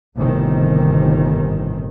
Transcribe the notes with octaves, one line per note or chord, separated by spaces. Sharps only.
G1 A2 C3 D#3